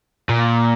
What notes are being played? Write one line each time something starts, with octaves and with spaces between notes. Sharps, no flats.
A#2